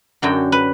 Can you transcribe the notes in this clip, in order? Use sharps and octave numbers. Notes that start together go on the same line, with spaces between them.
F#2 D3 F#3 G5
B4